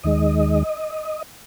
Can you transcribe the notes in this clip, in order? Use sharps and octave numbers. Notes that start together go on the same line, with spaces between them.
D#2 D#3 G#3 D#5